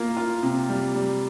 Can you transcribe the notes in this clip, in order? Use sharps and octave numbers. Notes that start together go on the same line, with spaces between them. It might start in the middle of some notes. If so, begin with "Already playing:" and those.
Already playing: A#3 F4
F4
C3
G3
G3